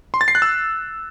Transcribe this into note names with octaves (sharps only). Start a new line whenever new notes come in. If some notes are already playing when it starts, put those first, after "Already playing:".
C6
A6
C7
F#6
E6